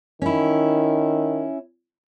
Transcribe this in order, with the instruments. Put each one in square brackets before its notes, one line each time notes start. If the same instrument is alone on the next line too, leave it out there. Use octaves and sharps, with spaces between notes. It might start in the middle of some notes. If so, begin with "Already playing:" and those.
[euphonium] D#3 [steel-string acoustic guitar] C#4 E4